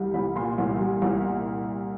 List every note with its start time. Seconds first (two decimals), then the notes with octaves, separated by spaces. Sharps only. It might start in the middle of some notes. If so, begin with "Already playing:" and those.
Already playing: C2 G3
0.14 C2 B5
0.36 A#2 C6
0.58 C2
0.80 G3
1.02 C2
1.25 A#2